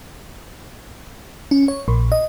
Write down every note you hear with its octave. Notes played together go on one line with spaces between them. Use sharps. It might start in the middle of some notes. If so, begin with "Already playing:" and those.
C#4
C#5
A#1
D#5